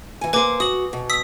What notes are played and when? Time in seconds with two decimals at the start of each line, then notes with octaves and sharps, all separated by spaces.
0.21 E3 G#5
0.33 A#3 B4 C5 G#5 D6
0.60 F#4 D#6 F#7
0.93 B2
1.10 D#6 E6 B6